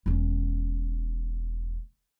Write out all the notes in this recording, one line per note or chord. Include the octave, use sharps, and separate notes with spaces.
E1 C#4